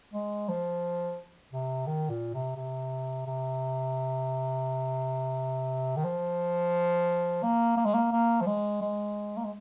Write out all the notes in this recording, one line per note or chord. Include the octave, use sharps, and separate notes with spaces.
G#3
F3
C3
D#3
A#2
C3
C3
C3
D#3
F3
A#3
A#3
G#3
A#3
A#3
F3
G#3
G#3
A#3
G#3